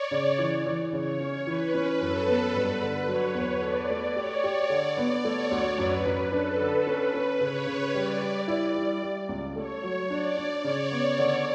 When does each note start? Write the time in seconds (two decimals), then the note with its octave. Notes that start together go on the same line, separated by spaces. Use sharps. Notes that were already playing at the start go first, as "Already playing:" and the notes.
Already playing: C#5 D5
0.11 C#3
0.39 E3
0.66 E3
0.92 C#3 C#5
1.20 C#4
1.46 E3 B4
1.74 C#4
2.00 F#2 A4
2.28 B3
2.54 G2 B4
2.82 D3
3.08 F#3 C#5
3.35 E2
3.62 A4 D5
3.90 A3
4.16 G4 C#5
4.44 G4
4.70 D3 D5
4.97 B3
5.24 A3 C#5
5.51 D2
5.78 F#2 B4
6.06 F#2
6.32 D4 A4
6.60 D3
6.87 C#4 B4
7.14 C#4
7.40 C#3 C#5
7.67 C#3
7.94 G3 D5
8.21 G3
8.48 E4
8.76 G3
9.03 G3
9.29 C#2
9.56 A3 C#5
9.83 F#3
10.10 D4 D5
10.37 D4
10.64 C#3 C#5
10.91 B3
11.18 D3